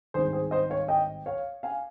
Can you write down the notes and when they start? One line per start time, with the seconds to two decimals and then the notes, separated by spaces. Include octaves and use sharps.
0.14 G#1 G2 D#3 G#4 C5
0.33 G#4 C5
0.51 C5 D#5
0.70 C#5 F5
0.88 D#5 G5
1.26 C#5 F5
1.63 F5 G#5